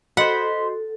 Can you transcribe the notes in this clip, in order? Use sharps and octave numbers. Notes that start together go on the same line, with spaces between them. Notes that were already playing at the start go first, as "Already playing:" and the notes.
F#4 A4 C5 D#5 F#5 B5 C6